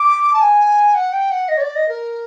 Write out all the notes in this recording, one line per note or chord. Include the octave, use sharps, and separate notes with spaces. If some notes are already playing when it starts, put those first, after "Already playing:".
Already playing: D6
A5
G#5
F#5
G5
F#5
D#5
C#5
D5
D#5
A#4